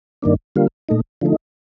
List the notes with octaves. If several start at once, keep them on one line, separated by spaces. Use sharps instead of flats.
G2 D#3 A#3 D4
D3 G3 A#3 F4
A#2 A3 D#4
D3 F3 A3 D#4